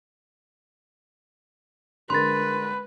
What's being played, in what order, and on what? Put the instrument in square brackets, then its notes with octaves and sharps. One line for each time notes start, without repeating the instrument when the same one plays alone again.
[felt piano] D3 G#3 A#4 [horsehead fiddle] B4 [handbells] C6 A6